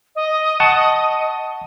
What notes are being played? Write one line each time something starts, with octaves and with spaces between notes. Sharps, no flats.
D#5
F#5 A5 C#6